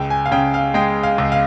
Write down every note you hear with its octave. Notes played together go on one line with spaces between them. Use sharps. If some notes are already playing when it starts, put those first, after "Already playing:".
Already playing: C#2 G5
G#5
F5
C#3 G5
F5
G#3 G5
F5
C#2
F5